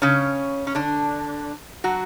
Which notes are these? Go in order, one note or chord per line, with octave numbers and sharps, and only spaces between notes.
C#3 C#4
C#4
D3 D4
F#3 F#4